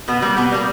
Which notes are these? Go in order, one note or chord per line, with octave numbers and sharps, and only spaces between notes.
B2 B3
G3 A#3
B2 B3
G3 A#3